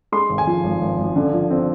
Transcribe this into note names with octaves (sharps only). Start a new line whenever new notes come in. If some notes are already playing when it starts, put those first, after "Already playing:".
G#3 C6
G#1
G#5
F3
G#1
G#1
G#1
D3
F3
C4